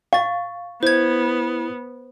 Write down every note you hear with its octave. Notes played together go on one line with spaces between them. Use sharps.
F5 C#6 A6
B3 E4 C5 G#6